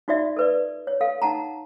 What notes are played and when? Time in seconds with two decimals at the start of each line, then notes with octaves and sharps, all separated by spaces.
0.08 D#4 F4 F#4 D5 E5
0.37 A4 B4 D5
0.87 C#5
1.01 A4 F5
1.22 D#4 F#5 A5 A#5